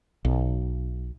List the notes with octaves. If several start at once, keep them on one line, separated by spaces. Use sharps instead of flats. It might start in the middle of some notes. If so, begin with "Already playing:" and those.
B1